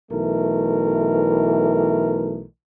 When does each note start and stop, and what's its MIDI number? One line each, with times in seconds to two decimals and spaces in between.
0.12 2.44 35
0.12 2.44 52
0.12 2.44 57
0.12 2.44 70